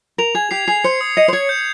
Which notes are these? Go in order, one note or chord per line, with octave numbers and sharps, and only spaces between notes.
A#4 F7
G#4 G#6
G4 C7
G#4 C7
C5 C#7
D#6
D#5 C#7
C5
C#5 G#6
G6